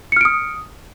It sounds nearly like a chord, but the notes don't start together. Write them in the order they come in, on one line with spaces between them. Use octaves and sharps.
C#7 F6 D7 D#6